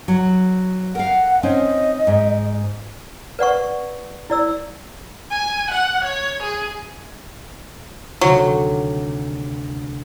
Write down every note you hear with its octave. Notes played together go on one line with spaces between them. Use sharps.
F#3
A#4 F5 F#5
C4 C#4 D#4 D#5
G#2
B4 D5 F#5 C#6
E4 D5 E6
G#5
F#5
C#5
G#4
D2 C3 D#3 F#3